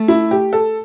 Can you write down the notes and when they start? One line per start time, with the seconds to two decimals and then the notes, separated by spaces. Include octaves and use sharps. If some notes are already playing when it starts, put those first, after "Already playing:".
Already playing: A3
0.08 E4
0.31 G4
0.53 A4